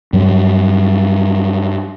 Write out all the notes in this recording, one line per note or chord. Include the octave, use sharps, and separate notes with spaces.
G2 F#3 G3